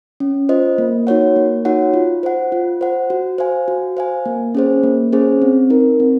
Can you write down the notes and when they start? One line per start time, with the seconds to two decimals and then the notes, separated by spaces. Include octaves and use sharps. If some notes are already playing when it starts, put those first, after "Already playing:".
0.20 C#4
0.49 F4 C5 D#5
0.78 A#3
1.07 D#4 F#4 C#5 F#5
1.36 A#3
1.65 D#4 F#4 C#5 F#5
1.94 F4
2.23 C5 F#5
2.52 F4
2.81 C5 F#5
3.10 F#4
3.38 C5 F5 G#5
3.68 F#4
3.97 C5 F5 G#5
4.25 A#3
4.55 C#4 G#4 C5
4.83 A#3
5.13 C#4 G#4 C5
5.42 C4
5.70 D#4 A#4
6.00 C4